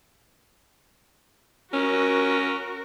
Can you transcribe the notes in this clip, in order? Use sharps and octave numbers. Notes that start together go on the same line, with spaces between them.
C#4 F#4 A#4